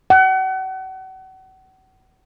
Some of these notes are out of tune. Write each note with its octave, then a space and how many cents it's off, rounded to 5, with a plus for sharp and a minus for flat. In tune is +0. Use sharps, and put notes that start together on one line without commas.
F#5 +35